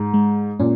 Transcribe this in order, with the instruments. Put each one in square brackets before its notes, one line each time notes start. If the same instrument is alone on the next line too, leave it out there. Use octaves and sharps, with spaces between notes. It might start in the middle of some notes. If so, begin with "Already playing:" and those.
Already playing: [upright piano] G#2
[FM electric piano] G#3
[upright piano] A#2 [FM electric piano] C#4